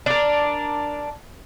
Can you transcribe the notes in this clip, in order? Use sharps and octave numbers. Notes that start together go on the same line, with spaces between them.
D4 A#4